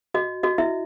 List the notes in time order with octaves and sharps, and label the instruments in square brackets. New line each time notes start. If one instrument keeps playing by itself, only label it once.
[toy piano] F#4 D#5
F#4 D#5
E4 E5